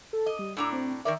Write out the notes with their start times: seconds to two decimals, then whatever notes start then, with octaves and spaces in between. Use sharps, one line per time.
0.13 A4
0.26 D#5
0.39 G3
0.57 A2 D4 A#5 E6
0.73 C4
1.05 D#3 A#4 D5 E5